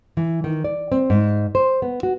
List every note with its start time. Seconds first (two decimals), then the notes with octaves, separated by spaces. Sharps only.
0.17 E3
0.44 D#3
0.64 D5
0.92 C4
1.10 G#2
1.55 C5
1.82 B3
2.03 F#4